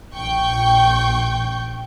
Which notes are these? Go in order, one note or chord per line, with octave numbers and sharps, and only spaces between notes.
A#1 G5 C#6 G6